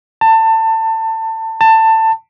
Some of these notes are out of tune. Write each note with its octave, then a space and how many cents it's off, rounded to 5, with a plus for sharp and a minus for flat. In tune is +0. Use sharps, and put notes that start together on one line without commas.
A5 +25
A5 +20